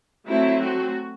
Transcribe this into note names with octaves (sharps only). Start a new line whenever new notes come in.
F#3 A3 C4 E4
F#4